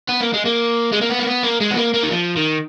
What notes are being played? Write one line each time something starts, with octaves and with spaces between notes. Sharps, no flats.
B3
A#3
G#3
A#3
G#3
A#3
B3
A#3
B3
A#3
G#3
B3
A#3
A#3
D#3
F3
D#3